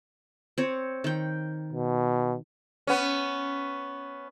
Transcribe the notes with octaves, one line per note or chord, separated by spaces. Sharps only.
C4 C#5
D#3 G5
B2
B3 C#4